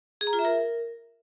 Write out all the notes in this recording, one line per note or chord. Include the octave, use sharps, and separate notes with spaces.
G#4
A#5
F4
E5
A#4